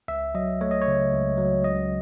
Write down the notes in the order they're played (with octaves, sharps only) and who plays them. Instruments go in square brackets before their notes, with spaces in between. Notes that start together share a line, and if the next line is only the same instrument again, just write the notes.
[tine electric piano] C#2 E5
F#3 D#5
A3 C#5
D#5
C#5
C#3
C#2
F#3
C#2 D#5